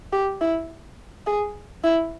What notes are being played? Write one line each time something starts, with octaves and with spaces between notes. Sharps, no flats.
G4
E4
G#4
E4